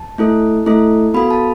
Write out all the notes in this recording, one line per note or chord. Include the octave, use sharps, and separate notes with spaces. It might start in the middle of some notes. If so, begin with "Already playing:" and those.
Already playing: A5
A3 E4 A4
A3 E4 A4
B3 F#4 A4 B5
A5